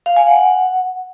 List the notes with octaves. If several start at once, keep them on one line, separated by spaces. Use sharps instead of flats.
F5
G#5
F#5
F#5